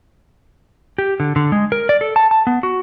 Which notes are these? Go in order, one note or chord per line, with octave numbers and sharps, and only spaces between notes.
G4
D3
D3
G#3
A#4
D5
A4
A5
A5
B3
F#4